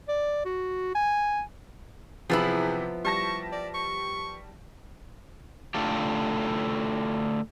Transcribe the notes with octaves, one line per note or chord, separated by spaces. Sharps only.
D5
F#4
G#5
C3 E3 F3 B3 E4 G#4
G3 A5 C#6 A#6
D5
C#6
D3 A3 F4 G4